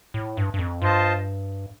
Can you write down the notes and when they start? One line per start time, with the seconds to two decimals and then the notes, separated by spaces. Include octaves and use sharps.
0.14 A2
0.37 G2
0.54 G2
0.59 F2
0.82 G2 F4 C5 D#5 A5